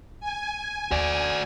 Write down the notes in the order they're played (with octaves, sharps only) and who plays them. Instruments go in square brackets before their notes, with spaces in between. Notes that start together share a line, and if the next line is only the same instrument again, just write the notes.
[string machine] G#5
[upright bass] D#2 [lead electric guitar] F#4 D5